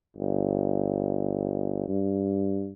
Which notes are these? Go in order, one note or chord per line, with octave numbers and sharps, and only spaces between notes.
G1
G2